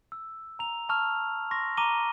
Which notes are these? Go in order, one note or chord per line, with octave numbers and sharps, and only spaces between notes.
E6
A#5 F7
A5 C#6 E6 F6 F7
C6 C#6 A#6
A#5 D6 A#6 D#7 G7